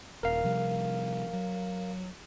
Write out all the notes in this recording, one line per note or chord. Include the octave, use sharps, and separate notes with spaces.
D#1 A#4 F5
C3 F3 G3
F#3